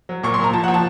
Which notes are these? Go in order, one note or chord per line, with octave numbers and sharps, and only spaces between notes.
F#3
A#2 C#6
A#2 C6
A#5
F3 A5
F3 F#5
A5